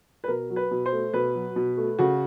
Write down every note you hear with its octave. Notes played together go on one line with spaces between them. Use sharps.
B4
B2 A#4
F#3
B4
B2
C5
A3
B2 B4
F#3
B2
A3
C#3 F#4